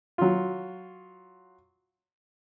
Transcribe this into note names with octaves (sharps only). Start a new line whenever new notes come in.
F#3 F4